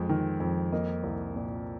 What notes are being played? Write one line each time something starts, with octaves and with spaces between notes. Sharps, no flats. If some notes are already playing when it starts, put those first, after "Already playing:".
Already playing: F2 G#3
D#3
F2
A#3 D#5
C2
A#2